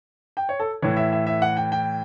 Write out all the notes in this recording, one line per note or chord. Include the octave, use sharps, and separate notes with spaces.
G5
C#5
A4
A2 E3 C#5
E5
E5
E5
F#5
G5
G5